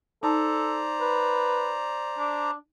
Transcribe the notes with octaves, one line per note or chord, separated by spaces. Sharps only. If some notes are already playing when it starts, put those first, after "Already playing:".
D#4 A4 C5 D5 A5 A#5
B4
D4